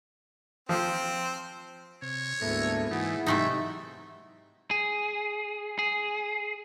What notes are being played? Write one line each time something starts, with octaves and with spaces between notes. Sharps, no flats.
F3 C4
C3 C#5
D2 G#2 A#3 B3 E4 A4
G#2 E3 A3 B3 D#4 E4 G#4
G#2 C3 E3 F#3 A3 D#4 E5
G#4
G#4